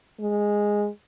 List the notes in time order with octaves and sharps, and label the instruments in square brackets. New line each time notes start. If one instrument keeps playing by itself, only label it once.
[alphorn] G#3